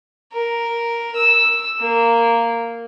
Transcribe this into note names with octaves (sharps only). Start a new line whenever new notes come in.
A#4
E6
A#3